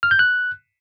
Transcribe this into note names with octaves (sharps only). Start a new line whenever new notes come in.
F6
G6
F#6